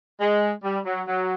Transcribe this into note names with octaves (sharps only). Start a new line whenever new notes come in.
G#3
G3
F#3
F#3